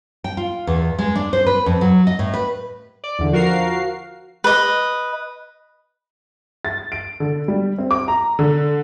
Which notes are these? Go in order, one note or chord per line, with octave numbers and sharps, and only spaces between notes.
G5
F4
E2
G#3
D4
C5
B4
F2
F#3
D#5
A2
B4
D5
E2 D3
F3 F#4 A#4 F5 C7
B4 D#5
A6
D7
D3
G3
C4
D6
A#5
D3